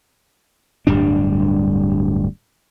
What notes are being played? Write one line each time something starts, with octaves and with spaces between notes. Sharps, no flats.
D1 G2 G3 D4